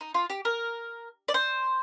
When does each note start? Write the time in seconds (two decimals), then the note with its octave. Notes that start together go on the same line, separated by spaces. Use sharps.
0.01 D#4
0.14 F4
0.30 G4
0.45 A#4
1.28 D5
1.34 C5